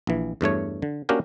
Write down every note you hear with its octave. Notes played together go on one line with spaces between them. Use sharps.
A#1 E3
E2 G2 A3 C#5
D3
A#3 C#4 D4 F#4 G4 A#4